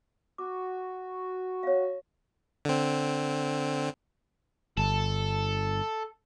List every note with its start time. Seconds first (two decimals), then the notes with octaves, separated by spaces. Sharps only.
0.38 F#4 D6
1.63 C#5 F5
2.65 D3 C4
4.78 G1 A4